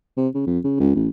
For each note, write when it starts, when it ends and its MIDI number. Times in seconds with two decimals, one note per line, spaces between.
0.17 0.28 48
0.35 0.42 49
0.47 0.59 41
0.64 0.80 49
0.80 0.92 37
0.95 1.08 33